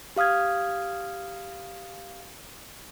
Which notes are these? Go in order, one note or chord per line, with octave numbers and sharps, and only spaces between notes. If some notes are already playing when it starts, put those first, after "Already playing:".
G4 F5 D#6 F6 G#6